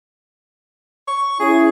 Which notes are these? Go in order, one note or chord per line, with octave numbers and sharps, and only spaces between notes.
C#6
C#4 E4 G#4